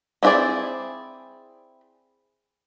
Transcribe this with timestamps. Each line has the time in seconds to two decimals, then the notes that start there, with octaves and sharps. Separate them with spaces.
0.23 C4 E4 F#4 G#4 D5